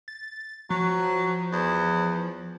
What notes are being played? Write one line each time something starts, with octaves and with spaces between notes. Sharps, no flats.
A6
F3 F#3
E2